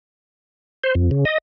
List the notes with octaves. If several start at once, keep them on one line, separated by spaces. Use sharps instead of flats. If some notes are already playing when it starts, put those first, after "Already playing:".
C5
F2
C#3
D#5